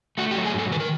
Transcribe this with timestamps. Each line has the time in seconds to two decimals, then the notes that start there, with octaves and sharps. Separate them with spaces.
0.18 A3 F#4
0.31 G4
0.35 F#3
0.46 G#4
0.54 G#2
0.59 A4
0.71 D#3 B4
0.80 A#4